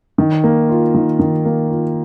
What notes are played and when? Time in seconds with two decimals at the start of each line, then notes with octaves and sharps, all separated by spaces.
0.18 D#3
0.44 A#3
0.69 F4
0.94 D#3
1.19 D#3
1.45 A#3
1.70 F4